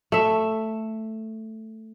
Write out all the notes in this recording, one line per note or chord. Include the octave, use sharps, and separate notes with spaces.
A3 E5